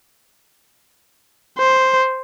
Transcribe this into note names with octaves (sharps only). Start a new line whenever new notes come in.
C5